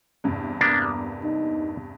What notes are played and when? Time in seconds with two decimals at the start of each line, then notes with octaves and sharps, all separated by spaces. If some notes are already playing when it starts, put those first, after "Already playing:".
0.24 E2 G2 C3
0.61 A#3 B3 D4
1.24 D#4